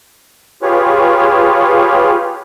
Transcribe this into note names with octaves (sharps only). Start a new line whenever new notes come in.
F4 G4 G#4 B4 C#5